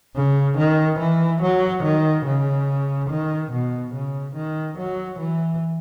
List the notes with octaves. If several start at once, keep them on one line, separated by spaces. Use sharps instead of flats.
C#3
D#3
E3
F#3
D#3
C#3
D#3
B2
C#3
D#3
F#3
E3